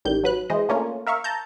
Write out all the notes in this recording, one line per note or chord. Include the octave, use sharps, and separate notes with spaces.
A1 D#3 G3 G6
F#3 B4 F#6
E3 G#3 C5 D#5
A3 A#3 C#4 D4 F4 A#4
A#4 E5 F5 C#6
A5 A#5 G6